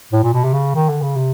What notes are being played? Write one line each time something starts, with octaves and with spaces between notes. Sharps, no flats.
A2
A#2
B2
C3
C#3
D#3
D3
C#3
C3